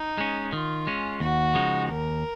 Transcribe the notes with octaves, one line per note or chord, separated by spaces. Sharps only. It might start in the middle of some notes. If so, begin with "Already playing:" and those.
Already playing: D#4
G#3 C#4
D#3 F4
G#3 C#4
D#2 F#4
C#3 F3 G#3 D#4
D#2 A#4